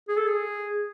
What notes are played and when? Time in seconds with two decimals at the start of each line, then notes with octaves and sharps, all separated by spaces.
0.08 G#4
0.17 A4
0.27 G#4